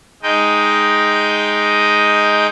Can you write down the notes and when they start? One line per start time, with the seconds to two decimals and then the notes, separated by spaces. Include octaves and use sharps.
0.23 G#3 D#4 D#5 G5